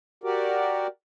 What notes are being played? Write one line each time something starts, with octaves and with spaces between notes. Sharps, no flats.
F#4 G4 A#4 D5